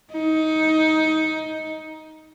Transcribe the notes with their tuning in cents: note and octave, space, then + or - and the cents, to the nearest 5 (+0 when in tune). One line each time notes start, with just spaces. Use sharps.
D#4 +15